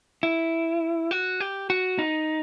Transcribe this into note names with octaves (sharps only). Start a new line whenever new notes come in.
E4
F#4
G4
F#4
D#4